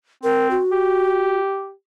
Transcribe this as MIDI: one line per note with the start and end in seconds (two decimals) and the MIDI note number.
0.23 0.58 60
0.23 0.50 70
0.51 1.39 66
0.72 1.72 67